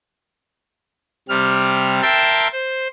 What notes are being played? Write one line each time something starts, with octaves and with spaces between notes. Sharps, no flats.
C3 G3 F6
A#4 E5 G5 A5 C6 E6
C5